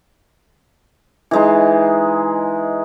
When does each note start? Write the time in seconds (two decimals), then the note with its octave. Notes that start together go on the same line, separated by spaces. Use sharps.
1.31 E3 G#3 D#4